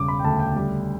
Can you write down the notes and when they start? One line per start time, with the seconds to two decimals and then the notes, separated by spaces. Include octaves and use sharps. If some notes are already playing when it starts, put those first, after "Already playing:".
Already playing: E1 C#3 G3 D6
0.08 B5
0.19 G5
0.24 D2 A5
0.39 G5
0.56 G3